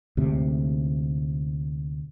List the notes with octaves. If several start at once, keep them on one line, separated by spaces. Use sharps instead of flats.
D2 G#2 C3